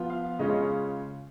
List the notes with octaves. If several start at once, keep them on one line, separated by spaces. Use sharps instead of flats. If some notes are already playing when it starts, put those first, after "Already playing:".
Already playing: F3 B3 F4
F5
C#3 G#3 C#4 F4 D#5
C#5